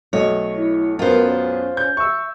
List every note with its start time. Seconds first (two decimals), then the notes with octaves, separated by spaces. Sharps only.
0.13 B1 A3 C#5 D#5
0.55 E4
0.99 F#2 B3 F4 A#4 C5
1.25 C#4
1.77 G6
1.97 E5 C#6 E6